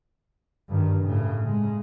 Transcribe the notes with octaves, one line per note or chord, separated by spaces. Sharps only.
G2 D#3
A2 C#3
C#3 G#3